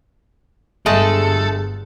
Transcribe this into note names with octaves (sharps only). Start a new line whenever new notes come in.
G1 G2 G#3 A3 G#4 A4